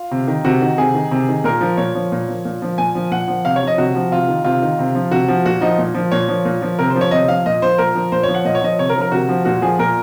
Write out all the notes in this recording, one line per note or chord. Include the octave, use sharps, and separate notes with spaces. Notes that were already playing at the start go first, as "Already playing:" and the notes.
Already playing: F4
C3
D#3
C3 F#4
D#3
C3 G#4
D#3
C3
D#3
A#2 A#4
F3
A#2 C#5
F3
A#2
F3
A#2
F3
A#2 G#5
F3
A#2 F#5
F3
C3 F5
C#5
F3
D#5
C3 F#4
F3
C3 F4
D#3
C3 F4
D#3
C3
F3
C3 F#4
F3
A#2 F#4
F3 D#4
A#2
F3
A#2 C#5
F3
A#2
F3
C3 A#4
C5
F3
C#5
C3 D#5
F3 F5
A#2 D#5
F3 C5
A#2 A#4
F3
A#2 C5
F3 C#5
F#5
A#2 D#5
C#5
F3 D#5
C3 C#5
A#4
F3
A#4
C3 F#4
F3
A#2 F#4
F3 G#4
A#2 A#4